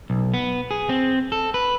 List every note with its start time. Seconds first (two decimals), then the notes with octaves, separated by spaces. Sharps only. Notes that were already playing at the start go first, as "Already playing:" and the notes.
0.10 B1
0.34 B3
0.71 G#4
0.89 C4
1.32 A4
1.54 B4